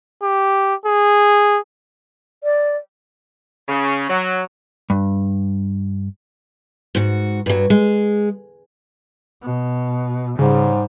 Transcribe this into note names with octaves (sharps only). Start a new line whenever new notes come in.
G4
G#4
D5
C#3
F#3
G2
G#2 F#4
G2 F#3
G#3
B2
G#2 C#3 G3